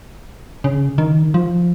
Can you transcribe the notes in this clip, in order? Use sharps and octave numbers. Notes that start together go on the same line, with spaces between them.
C#3
D#3
F3